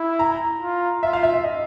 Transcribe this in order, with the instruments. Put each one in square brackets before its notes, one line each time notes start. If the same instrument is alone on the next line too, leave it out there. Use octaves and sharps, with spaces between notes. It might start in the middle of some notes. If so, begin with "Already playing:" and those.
Already playing: [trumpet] E4
[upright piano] A#5
[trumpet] F4
[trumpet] F4 [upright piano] E5
[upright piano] F5
E5
E5
D#5